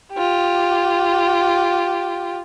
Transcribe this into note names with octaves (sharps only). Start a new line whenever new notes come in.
F4 G4